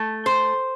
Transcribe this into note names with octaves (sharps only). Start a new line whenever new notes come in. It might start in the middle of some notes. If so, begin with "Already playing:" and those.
Already playing: A3
C5